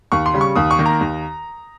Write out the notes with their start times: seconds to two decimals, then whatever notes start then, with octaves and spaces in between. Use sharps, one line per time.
0.12 D#2 C#6
0.26 C6
0.34 C#3 G3
0.41 C#6
0.56 D#2 D#6
0.71 C#6
0.79 D#3 A#3
0.86 A#5
1.01 D#2